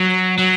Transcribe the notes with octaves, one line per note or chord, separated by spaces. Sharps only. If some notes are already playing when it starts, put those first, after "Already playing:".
Already playing: F#3
F#3